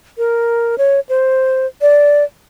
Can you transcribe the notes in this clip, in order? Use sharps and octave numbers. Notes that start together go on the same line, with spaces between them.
A#4
C#5
C5
D5